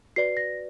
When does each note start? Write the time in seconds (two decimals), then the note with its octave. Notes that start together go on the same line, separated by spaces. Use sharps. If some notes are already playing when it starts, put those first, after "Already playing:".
0.16 F#4 B4 D5 C7
0.37 A#6